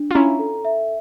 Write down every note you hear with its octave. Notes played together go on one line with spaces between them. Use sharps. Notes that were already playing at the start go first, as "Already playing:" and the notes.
Already playing: D4
F4
C#4 E4 A#5
A4
E5